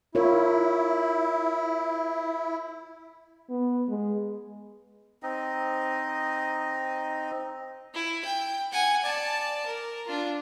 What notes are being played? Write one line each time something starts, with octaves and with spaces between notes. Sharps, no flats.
E4 F4 A#4 C#5
B3
G#3
C4 D#4 D#5
E4
G5
F#5 G#5
D5 A5
A#4
D4 F4